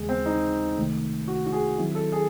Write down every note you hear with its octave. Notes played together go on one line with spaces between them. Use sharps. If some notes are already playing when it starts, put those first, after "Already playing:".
Already playing: D#2 C#3 E3 G#3
C4
D#4
C2 C3 D#3 A3
F#4
F#4
G#4
D#3 F#3 C4 E4
A4
G#4